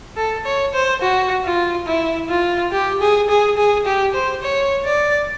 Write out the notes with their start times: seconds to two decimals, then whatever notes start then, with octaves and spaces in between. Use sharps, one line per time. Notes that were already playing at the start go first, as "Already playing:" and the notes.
0.17 A4
0.45 C#5
0.73 C5
1.01 F#4
1.45 F4
1.86 E4
2.29 F4
2.72 G4
3.01 G#4
3.29 G#4
3.57 G#4
3.85 G4
4.14 C5
4.42 C#5
4.85 D5